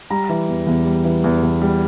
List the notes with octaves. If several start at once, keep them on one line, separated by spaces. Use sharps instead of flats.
G3 A#5
E3
E2
E2
G3
E3
E2
E2
G3